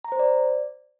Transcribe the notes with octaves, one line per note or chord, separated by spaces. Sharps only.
A#5
C5
D5